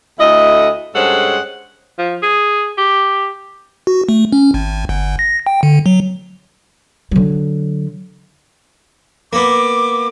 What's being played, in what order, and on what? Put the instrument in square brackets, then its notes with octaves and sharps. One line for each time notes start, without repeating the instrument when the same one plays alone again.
[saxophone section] D2 A3 E4 D#5
G2 G#3 C#4 A4 C5 F#5
[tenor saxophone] F3
G#4
G4
[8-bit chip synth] F#4
A3
C#4
G#1
G1
A#6
G5
D3
F#3
[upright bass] D3 F#3
[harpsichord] A#3 B3 [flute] D6